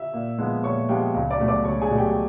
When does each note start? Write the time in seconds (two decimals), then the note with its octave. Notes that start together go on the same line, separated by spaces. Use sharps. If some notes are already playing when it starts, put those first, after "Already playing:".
Already playing: E5 E6
0.13 A#2
0.38 F3 G#3 B3
0.63 A#2 C#5 C#6
0.89 F3 G#3 B3 G4 G5
1.14 C#2
1.31 D5 D6
1.40 B2 F#3 A3
1.48 D5 D6
1.65 C#2 C#5 C#6
1.81 G#4 G#5
1.90 B2 F#3 A3
1.98 G4 G5